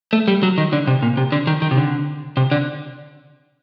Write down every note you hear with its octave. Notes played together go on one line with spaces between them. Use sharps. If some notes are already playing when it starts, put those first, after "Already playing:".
A3
G3
F#3
D#3
D3
C3
A#2
C3
D3
D#3
D#3
C3
D3
C3
D3